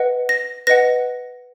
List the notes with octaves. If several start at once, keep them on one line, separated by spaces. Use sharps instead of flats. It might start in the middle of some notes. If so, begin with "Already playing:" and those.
Already playing: B4 D#5 F#5
A#6
B4 D#5 F#5 A#6